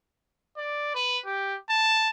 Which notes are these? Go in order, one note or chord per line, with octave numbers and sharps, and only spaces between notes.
D5
B4
G4
A5